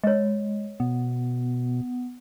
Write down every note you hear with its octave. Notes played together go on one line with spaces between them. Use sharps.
G#3 C#5 D#5
B2 B3